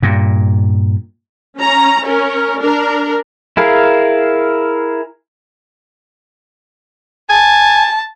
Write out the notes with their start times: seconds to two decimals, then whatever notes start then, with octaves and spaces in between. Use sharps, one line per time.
0.03 G2 A#2
1.58 C#4 A#5
2.05 C#4 A#4
2.60 D4 A#4
3.57 E4 G#4 A#4 F5
7.30 G#5 A5